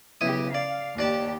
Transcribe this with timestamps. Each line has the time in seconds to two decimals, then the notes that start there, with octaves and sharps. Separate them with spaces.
0.21 B1 C#3 E4 G4 D#6
0.54 D5 F5
0.98 D#2 D4 G4 D5 A5